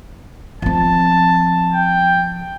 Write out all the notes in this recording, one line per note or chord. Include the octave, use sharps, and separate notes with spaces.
F3 C4 A5
G5